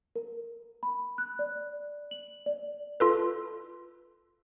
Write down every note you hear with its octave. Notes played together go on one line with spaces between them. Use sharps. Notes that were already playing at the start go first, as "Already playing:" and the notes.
A#4
B5
F#6
D5
F#7
D5
F4 A4 B4